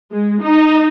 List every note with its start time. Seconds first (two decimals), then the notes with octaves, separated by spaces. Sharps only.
0.12 G#3
0.42 D#4